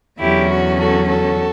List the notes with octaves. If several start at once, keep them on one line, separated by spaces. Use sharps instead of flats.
E2 D3 F#3 C#4 E4 G4
F#4
F#4 A4
F#4 A4